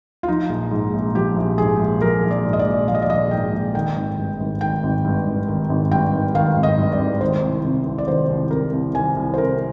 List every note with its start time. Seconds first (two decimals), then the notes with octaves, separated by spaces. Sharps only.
0.23 F4
0.28 F3 D#4
0.49 A#1
0.71 G#2
0.93 A#1
1.15 F3 G4
1.36 A#1
1.58 G#2 G#4
1.80 A#1
2.01 F3 A#4
2.23 A#1
2.31 D5
2.45 G#2
2.53 D#5
2.59 D5
2.66 A#1
2.88 F3 F5
2.95 D#5
3.02 D5
3.10 A#1 D#5
3.31 G#2 G5
3.52 A#1
3.74 D#3 G5
3.96 G#1
4.18 G2
4.40 G#1
4.61 D#3 G5
4.83 G#1
5.04 G2
5.26 G#1
5.48 D#3
5.70 G#1
5.91 G2 G5
6.13 G#1
6.35 D#3 F5
6.56 G#1
6.63 D#5
6.78 G2
6.92 D5
7.00 G#1
7.21 D#3 C5
7.43 C2
7.65 C3
7.86 C2
7.98 D5
8.08 D#3 C5
8.29 C2
8.51 C3 A#4
8.73 C2
8.94 D#3 G#5
9.16 C2
9.34 C5
9.38 C3 A#4